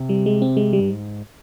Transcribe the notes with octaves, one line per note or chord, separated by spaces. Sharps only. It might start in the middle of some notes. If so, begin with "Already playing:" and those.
Already playing: C3
G3
G#3
C4
G#3
G3
G2
G#2